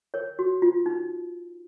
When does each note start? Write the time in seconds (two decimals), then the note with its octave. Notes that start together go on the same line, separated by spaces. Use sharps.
0.14 A#4 C#5
0.39 F#4
0.62 F4
0.86 D#4